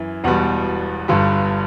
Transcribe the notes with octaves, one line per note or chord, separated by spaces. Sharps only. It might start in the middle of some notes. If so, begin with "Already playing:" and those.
Already playing: F#2 E3
E1 E2 B2 G3 F#5
G1 G2 D3 G3